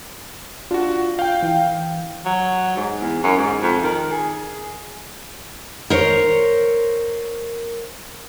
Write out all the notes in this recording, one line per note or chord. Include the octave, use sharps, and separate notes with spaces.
D4 F4 F#4
F5 G5 G6
E3
F#3
G#2
E2
F#2
G#2
F2
D#3
G#4
A#4 C5 C#5